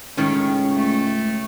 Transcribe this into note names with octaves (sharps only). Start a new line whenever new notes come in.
C#2 A2 D#3 C#4
A3